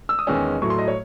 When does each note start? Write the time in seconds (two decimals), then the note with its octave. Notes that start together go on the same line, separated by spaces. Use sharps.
0.09 E6
0.19 D#6
0.27 E2 D#3 G#3 C#4 E6
0.62 A2 F#3 A3 C#6
0.70 C6
0.78 D#5
0.88 C#5